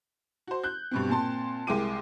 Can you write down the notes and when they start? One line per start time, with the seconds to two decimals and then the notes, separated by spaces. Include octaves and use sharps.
0.47 F#4 C5
0.64 F#6 G6
0.91 G2 B2 C4
1.09 A#2 C4 A5 C6
1.67 C2 G#3 A#4 G5 D6 D#7